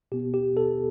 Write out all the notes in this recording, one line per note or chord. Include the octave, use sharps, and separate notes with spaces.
B2 B3 G4
G4
A4